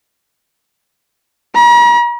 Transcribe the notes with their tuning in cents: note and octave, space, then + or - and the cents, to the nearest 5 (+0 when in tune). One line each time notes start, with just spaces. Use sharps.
A#5 +45